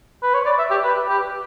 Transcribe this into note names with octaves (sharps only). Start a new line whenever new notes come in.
B4
C#5
D5
E5
G4
B4
G4